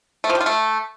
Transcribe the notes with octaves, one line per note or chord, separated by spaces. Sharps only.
A3
F3
G3
F4
A3